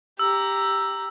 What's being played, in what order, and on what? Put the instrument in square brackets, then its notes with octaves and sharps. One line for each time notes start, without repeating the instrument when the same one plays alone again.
[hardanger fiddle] G4 A#5 [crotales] E6